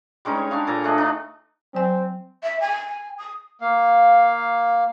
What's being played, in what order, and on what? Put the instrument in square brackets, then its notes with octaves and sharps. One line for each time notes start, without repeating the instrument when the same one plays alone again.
[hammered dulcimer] G3 G#3 C#4 D#4
C#5
D4 C#5 F5
A#2 A4 G#5 A#5
A3 D4 G#4 D#5
D4 D#4
[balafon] F#3 G#5 [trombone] C4
[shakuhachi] E5
G#5
G#5
D#6
[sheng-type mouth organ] A#3 F5